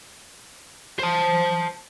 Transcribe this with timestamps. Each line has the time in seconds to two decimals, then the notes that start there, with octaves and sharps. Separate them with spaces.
0.99 C5 A5